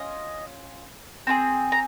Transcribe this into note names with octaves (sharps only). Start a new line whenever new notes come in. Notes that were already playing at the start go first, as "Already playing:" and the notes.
Already playing: C#4 F4 D#5
C4 F4 G#4
A#5